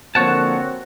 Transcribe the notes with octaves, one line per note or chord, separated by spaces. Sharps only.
D3 F3 A#3 C4 F#4 C#5 F#5 A5